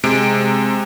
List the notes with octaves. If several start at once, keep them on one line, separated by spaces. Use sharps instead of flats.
C3 G#3 D7